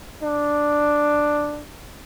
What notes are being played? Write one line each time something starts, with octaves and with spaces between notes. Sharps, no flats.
D4